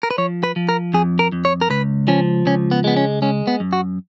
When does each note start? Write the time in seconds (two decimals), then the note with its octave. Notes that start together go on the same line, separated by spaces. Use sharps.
0.03 A#4
0.11 B4
0.18 F3 C#5
0.43 B4
0.56 F3
0.69 A#4
0.94 F2 G#4
1.19 A#4
1.32 F2
1.45 C#5
1.61 A#4
1.70 C#2 B4
2.08 F3 C#4
2.46 C#2 C#4
2.71 B3
2.84 G#3 B3
2.97 C#4
3.22 G#3 C#4
3.47 B3
3.60 F#2
3.73 F#4